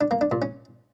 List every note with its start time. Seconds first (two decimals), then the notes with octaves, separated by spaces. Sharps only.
0.01 D4
0.11 A#3
0.21 D4
0.31 A#2
0.42 C#4